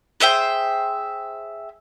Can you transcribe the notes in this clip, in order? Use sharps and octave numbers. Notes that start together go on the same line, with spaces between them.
G#4 C5 E5 G5